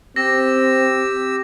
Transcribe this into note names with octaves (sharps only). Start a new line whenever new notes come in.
C4 G4 E6 A#6